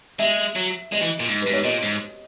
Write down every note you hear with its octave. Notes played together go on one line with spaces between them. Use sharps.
G#3 E5
F#3
G#3 D#5
E3
A#2
G#2
G#2 B4
C#5
A#2 D#5
G#2